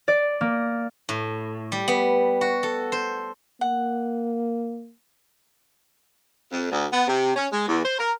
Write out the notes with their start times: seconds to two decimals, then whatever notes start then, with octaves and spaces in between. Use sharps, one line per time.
0.08 D5
0.41 A#3
1.09 A2
1.72 G3
1.88 B3
2.41 F#4
2.63 A4
2.92 C5
3.61 A#3 F#5
6.51 F2
6.71 D2
6.92 B3
7.08 C3
7.36 C#4
7.52 G#3
7.67 E2
7.84 C5
7.99 A#4